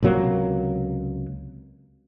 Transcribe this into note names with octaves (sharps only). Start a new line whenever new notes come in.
C#2 C3 F#3 A#3